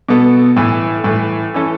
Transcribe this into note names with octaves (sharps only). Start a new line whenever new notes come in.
B2 B3 A4
A2 E3 A3
A2 E3 A3
E3 C#4 A4